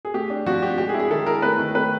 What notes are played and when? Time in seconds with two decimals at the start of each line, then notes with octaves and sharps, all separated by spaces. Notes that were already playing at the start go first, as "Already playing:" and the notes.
0.05 G#4
0.14 A3 G4
0.30 D4
0.46 F3 F#4
0.62 D4 G4
0.78 G#3 G4
0.89 G#4
0.94 E4
1.00 G#4
1.10 D#3 A4
1.26 E4 A#4
1.42 A3 B4
1.59 D#3
1.75 A3 B4